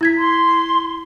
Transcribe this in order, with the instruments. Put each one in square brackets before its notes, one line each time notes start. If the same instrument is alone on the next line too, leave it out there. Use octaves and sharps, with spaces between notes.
[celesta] E4 G#6 B6
[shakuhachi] C6